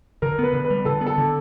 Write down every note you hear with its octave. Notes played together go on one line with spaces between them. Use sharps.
D3 A#4
B3 B4
D3
B4
G3
D3 A4
B3
A4
D3